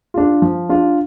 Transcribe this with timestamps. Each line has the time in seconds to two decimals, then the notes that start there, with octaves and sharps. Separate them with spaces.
0.14 D4 F4
0.42 F3
0.69 D4 F4